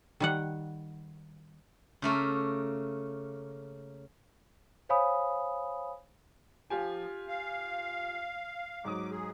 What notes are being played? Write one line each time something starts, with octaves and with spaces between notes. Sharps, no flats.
D#3 G3 F#5
C#3 A3 A#3 A4
C5 C#5 F5 G#5 B5 D#6
F3 F4 G4 G#5
F5
G#2 F#3 D6 D#6
G#4